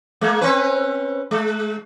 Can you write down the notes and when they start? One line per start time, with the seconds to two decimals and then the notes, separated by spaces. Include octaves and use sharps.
0.21 G#3 A#3
0.41 C4 C#4 B4
1.31 G#3